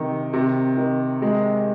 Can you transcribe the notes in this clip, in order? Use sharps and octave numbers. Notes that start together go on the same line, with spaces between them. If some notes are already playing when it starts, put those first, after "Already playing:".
Already playing: C3 D#3
C3
D#3
G#3